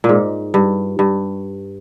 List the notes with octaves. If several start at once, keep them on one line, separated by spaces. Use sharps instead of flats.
A#2
G#2
G2
G2